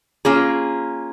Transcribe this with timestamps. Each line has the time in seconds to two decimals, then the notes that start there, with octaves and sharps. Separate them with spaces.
0.25 A#3 C#4 F4 G#4